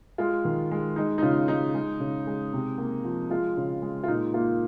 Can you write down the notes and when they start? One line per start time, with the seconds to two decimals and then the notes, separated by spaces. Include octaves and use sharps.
0.18 G#3 F4
0.45 D#3
0.71 G#3
0.96 G#3 D#4
1.18 D#4
1.22 C#3 F4
1.48 G#3 D#4
1.74 G#3
2.00 C#3
2.27 G#3
2.53 C3
2.78 A#3
3.04 F3
3.30 G#3 F4
3.57 C#3
3.82 G#3
4.04 F4
4.08 A#2 D#4
4.34 A#3 F4